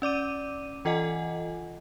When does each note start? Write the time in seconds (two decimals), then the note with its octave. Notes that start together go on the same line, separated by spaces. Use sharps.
0.02 C#4 D5 D6 D#7
0.85 E3 F4 A4 D#5 F#5 G#5